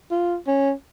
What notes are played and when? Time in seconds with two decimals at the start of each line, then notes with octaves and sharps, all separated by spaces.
0.11 F4
0.47 C#4